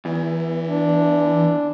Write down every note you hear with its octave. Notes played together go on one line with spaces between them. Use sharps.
E2 E3
D4